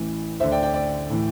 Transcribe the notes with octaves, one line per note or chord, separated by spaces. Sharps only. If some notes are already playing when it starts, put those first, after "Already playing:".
Already playing: A1 A2 E3
D2 D3 C5 E5
D5 G5
D5 G5
D5 G5
A2 E3